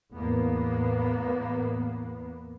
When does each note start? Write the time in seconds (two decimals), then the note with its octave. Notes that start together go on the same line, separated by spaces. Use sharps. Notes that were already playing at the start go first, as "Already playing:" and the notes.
0.15 E2 A2 A#3 B3